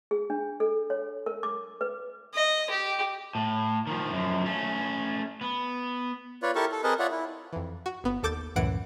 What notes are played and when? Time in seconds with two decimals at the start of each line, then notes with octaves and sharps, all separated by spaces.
0.11 G#4
0.30 D4
0.60 A4
0.90 C#5
1.26 A#4
1.43 D6
1.81 B4
2.35 D#5
2.71 G4
3.35 A2
3.87 D#3 F3
4.11 F#2 F3
4.46 A3 C#4
5.41 B3
6.43 F4 B4 C#5 D5
6.55 E4 G4 A4 A#4 A5 C#6
6.72 A4
6.84 C4 G#4 A#4 B4 D#5 A5
6.99 F4 C#5 D5 E5 F#5
7.12 E4
7.53 F2 E3
7.86 F#4
8.04 G1 B3
8.23 D#2 A4 D6 G6 A6
8.56 C#2 F#2 A2 E3 F#5 D7